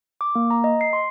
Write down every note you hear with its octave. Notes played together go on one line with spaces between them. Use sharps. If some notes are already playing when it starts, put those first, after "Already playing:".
D6
A#3
A#5
D#5
C7
C6